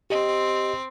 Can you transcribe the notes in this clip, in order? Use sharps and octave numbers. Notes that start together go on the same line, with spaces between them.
C4 G4 D#5